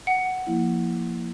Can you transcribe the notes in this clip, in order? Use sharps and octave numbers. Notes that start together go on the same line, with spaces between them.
F#5
F3 A#3 E4